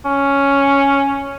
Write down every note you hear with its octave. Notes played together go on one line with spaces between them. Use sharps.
C#4